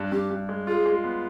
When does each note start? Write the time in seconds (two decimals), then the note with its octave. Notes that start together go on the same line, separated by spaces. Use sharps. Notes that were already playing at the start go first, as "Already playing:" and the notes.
Already playing: G2
0.12 G2 G4
0.31 G2
0.49 G#3
0.67 F4 G#4
0.86 G#3
1.04 B3